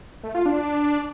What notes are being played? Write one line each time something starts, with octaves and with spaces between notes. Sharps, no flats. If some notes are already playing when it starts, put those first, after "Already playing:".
A3
F4
D4